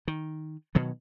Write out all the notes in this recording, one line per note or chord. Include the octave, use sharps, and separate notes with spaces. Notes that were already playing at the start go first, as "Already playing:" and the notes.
D#3
B2 D#3 F#3